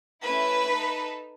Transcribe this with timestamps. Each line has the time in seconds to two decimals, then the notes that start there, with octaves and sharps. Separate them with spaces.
0.24 A3 C#4 E4 B4
0.69 D#4 A4